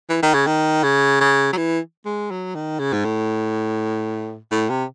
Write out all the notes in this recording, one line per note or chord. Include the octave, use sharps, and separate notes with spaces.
E3
D#3
C#3
D#3
C#3
C#3
F#3
E3
G#3
F#3
D#3
C#3
G#2
A2
A2
C3